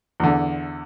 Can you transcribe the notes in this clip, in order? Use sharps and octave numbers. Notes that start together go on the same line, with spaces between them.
E2 D3